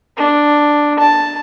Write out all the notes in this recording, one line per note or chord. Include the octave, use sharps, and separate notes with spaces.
D4
A5